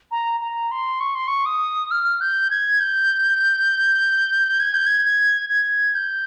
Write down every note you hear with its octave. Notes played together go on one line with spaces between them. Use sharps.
A#5
A#5
C6
C#6
C6
C#6
D#6
F6
G6
G#6
G6
G#6
G6
G#6
G#6
G#6
G6